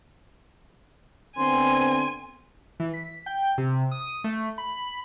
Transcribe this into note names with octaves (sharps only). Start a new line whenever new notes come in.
D3 B3 C4 G#5 C6
E3
B6
G5
C3
D#6
A3
B5